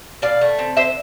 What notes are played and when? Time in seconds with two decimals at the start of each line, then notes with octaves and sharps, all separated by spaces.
0.22 B2 D5 F5
0.41 A3
0.59 C4
0.77 D3 C5 E5